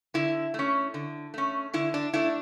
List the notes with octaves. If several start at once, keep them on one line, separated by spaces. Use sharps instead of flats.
D3 E4
A3 C#4
D3
A3 C#4
D3 E4
D4
A3 D4 E4